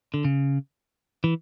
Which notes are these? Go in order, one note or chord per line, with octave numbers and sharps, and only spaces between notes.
D3
C#3
E3